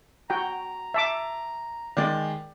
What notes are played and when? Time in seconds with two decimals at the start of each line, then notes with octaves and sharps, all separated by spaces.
0.30 F#4 G5 A#5
0.94 E5 A5 D6
1.97 D#3 G#3 D5